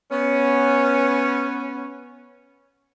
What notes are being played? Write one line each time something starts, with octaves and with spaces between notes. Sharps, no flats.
B3 C#4